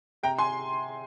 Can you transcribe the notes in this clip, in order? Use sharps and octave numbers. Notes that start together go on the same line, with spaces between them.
C3 G5 A#5
G#5 C6